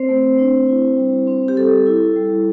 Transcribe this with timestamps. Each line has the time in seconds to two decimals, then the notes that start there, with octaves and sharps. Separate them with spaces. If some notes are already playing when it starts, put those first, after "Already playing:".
Already playing: C4 C5
0.09 A3
0.38 D4
0.68 E4
0.97 G3
1.27 C4
1.48 G4
1.57 G3 A4
1.86 E4
2.16 G3